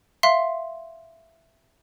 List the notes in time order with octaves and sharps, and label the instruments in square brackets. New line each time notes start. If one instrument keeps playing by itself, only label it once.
[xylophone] E5 F5 C6